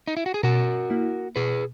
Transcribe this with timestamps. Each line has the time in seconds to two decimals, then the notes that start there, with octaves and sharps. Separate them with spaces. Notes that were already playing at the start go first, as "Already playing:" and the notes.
0.08 D#4
0.17 E4
0.26 F#4
0.34 G#4
0.43 B2 F#4 A#4
0.90 A#3 E4
1.36 B2 G#4 B4